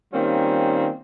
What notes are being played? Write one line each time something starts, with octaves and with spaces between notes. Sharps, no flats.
D#3 G3 A#3 C4 C#4 F4